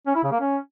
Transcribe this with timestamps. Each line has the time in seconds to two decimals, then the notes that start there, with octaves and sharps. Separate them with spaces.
0.07 C#4
0.15 E4
0.23 C#3
0.32 A#3
0.40 C#4